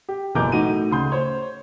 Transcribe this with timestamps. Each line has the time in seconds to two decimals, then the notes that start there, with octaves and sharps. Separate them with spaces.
0.08 G4
0.35 F#1 B2 E3 A#4 D6 G6
0.52 A2 D#4 F#4 D#7
0.91 D2 C#3 C6 G6
1.12 C5 C#5